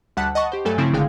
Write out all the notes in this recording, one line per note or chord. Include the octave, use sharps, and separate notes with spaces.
D2 G3 F#5 A5 F#6 B6
D#5 F#5 A5 B5 C#6
G4 C5
G2 F#3 A3 A4 G#5
C#3 F3 A3 C4 E4
G#1 D3 G#3 G#4 F5 G5